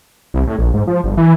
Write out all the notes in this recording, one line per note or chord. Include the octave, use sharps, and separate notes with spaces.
C2
A2
A#1
G#2
F3
G1
E3